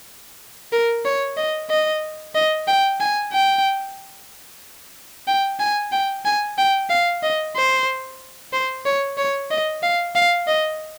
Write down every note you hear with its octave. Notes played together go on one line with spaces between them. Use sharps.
A#4
C#5
D#5
D#5
D#5
G5
G#5
G5
G5
G#5
G5
G#5
G5
F5
D#5
C5
C5
C#5
C#5
D#5
F5
F5
D#5